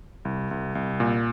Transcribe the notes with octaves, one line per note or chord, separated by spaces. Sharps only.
C2
C2
C2
A#2